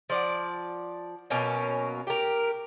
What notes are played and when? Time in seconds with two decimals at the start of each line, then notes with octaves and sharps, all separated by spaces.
0.10 F3 D5 F#5
1.30 B2 F#3 A#3 C#4
2.07 G4 A#4